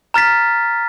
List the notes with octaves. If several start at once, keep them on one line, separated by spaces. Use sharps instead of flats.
A#5 F6 A6 B6